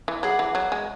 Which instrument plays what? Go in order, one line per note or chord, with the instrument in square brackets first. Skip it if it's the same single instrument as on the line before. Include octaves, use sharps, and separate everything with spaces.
[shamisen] E3
[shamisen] F#3 [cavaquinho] G#4 B4 D5 F#5
[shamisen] E3
F#3
G#3